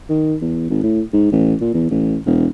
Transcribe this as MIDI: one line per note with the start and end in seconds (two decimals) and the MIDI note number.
0.09 0.36 51
0.41 0.65 40
0.70 0.83 32
0.83 1.01 45
1.13 1.31 44
1.32 1.54 33
1.61 1.74 46
1.74 1.87 40
1.91 2.17 33
2.26 2.47 28